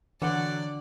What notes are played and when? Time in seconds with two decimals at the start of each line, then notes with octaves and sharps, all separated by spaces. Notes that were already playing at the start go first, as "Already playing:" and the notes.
0.22 D3 E3 F#3 D5 F#5 G5